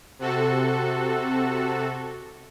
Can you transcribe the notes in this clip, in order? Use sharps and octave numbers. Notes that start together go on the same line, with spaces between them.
C3 F#4 A4